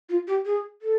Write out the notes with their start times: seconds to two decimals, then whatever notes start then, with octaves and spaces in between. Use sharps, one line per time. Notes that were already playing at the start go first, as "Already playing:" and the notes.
0.09 F4
0.27 G4
0.46 G#4
0.82 A4